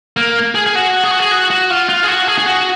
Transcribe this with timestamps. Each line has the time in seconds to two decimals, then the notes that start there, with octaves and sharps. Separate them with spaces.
0.17 A#3
0.55 G#4
0.66 G#4
0.75 F#4
1.04 G#4
1.11 F#4
1.19 G#4
1.31 F#4
1.50 F#4
1.70 F4
1.89 F4
2.03 G#4
2.08 F#4
2.27 G#4
2.38 G#4
2.47 F#4